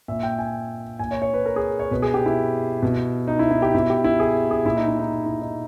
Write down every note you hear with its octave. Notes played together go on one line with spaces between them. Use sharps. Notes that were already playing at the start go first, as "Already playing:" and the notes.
A#2 E5
G5
G#5
A#2 G#5
C#5
C#5
B4
A#4
G#4
C#5
B2 B4
G#4
G4
E4
B2
D#4
E4
E4
G4
B2 E4
G4
E4
G#4
G#4
A#2 E4
D#4
E4
D#4
E4
D#4